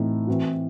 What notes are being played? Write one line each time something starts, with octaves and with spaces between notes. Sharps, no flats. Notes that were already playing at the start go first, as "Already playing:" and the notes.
Already playing: A2 E3 A3 C4 D#4
E3 C4 F#4